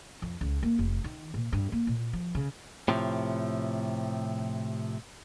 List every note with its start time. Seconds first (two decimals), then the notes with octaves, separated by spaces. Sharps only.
0.22 F2
0.41 C#2
0.63 A#3
0.79 F1
1.04 D#3
1.34 A#2
1.53 G2
1.72 A#3
1.87 A#2
2.13 F3
2.35 C#3
2.88 A2 C3 F3